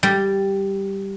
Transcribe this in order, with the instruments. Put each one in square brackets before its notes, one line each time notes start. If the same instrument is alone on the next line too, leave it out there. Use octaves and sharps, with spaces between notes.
[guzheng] G3